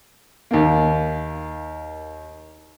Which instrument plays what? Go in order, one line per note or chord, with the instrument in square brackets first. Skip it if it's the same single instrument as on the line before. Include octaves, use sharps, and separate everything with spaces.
[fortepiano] D#2 A#3